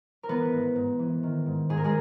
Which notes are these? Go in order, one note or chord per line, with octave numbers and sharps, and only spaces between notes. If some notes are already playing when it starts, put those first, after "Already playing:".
A#4
E3 B3 B4
G#2
G#2
E3
D#3
G#2
G#2 G#4
A#4
G#3 G#4